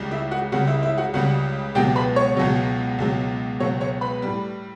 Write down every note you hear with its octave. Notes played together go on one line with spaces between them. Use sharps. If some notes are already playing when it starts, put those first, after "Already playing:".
Already playing: C#2 C#3 G3
E4 E5
F#4 F#5
C#2 C#3 G3 F#4 F#5
E4 E5
E4 E5
F#4 F#5
C#2 C#3 G3 F#4 F#5
C#2 B2 F#3 G4 G5
B4 B5
C#5 C#6
C#2 B2 F#3
C#2 B2 F#3
C#2 B2 F#3 C#5 C#6
C#5 C#6
B4 B5
A2 G3